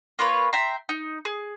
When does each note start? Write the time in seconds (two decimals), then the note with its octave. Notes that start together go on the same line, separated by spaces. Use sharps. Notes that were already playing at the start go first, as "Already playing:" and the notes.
0.19 A#3 F4 B4 C#5
0.53 E5 G5 A#5 C6
0.89 D#4
1.25 G#4